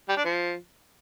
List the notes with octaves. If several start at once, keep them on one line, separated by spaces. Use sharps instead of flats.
G3
D4
F3